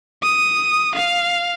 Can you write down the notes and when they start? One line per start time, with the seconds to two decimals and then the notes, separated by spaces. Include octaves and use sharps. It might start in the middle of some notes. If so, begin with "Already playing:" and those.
0.23 D#6
0.95 F5